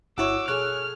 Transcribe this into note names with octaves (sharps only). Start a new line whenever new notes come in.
G1 E4 F#4 C#5 D6 E6
B2 G#4 A4 C#5 F6 F#6